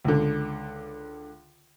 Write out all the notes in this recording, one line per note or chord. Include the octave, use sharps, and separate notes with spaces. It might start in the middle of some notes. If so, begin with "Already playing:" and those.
C#2 D3